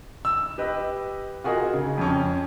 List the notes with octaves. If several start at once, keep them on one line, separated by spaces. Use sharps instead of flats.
E6
G4 B4 D#5
F4 F#4 G#4 A#4 D#5
C#3
F2 C#4